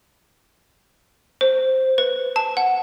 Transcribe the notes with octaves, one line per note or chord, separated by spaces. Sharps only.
C5
B4
A5
F#5